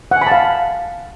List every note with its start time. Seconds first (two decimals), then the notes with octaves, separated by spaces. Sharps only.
0.11 F#5
0.16 G#5
0.22 B5
0.27 A5
0.32 F5